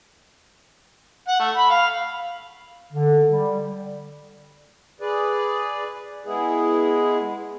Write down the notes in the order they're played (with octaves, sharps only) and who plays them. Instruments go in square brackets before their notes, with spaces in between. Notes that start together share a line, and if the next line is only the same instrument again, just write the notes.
[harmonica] F#5
A3
B5
F5
[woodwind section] D3
G3
[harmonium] G#4 B4 D5
G#3 B3 E4 G#4